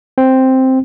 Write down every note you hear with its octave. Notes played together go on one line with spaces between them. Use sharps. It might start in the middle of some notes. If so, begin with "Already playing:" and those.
C4